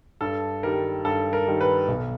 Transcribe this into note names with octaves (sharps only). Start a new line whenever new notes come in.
G2 A4
D#3 G3 A#4
G2 A4
A#4
D#3 G3
B4
B1